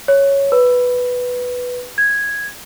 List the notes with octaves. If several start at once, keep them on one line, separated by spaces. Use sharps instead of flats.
C#5
B4
G#6